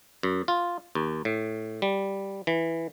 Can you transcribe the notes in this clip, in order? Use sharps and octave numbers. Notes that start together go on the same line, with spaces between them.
F#2
F4
D#2
A2
G3
E3